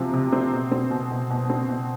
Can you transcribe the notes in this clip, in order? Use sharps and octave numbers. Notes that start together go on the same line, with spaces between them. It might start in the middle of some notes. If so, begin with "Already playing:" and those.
Already playing: C3 F3 C4
C3
C4
B2
C4
B2
B2
B2
C4
B2